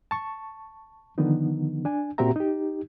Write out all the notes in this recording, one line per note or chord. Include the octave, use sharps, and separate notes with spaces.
A5 C#6
D3 D#3 F3 B3 D#4
D4 G#5
A#2 C4 F#4 G4 E5 A#5
D#4 G4